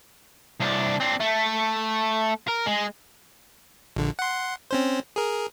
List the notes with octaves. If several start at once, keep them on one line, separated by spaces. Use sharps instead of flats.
C2 D4
C4 D4
A3
A#4
G#3
A#1 D3
F#5 C6
C4 C#4 C5
G#4 A#4